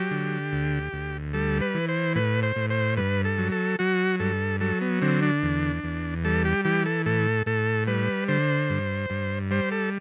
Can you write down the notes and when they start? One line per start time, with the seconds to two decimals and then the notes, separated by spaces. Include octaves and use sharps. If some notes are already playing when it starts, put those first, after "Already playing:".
Already playing: F#3 G4
0.11 D3
0.52 D2
0.93 D2
1.34 G3 A4
1.61 B4
1.75 E3
1.88 C5
2.15 A2 B4
2.43 C5
2.56 A2
2.70 C5
2.97 G2 B4
3.25 A4
3.38 F#3
3.52 A4
3.79 F#3 F#4
4.20 G2 A4
4.61 F#3 A4
4.81 B3
5.02 D3 C4
5.22 D4
5.42 E2
5.84 E2
6.24 G3 A4
6.45 G4
6.65 E3 G4
6.86 A4
7.06 A2 A4
7.46 A2 A4
7.87 G3 B4
8.28 D3 C5
8.70 G2
9.10 G2
9.51 G3 C5
9.71 A4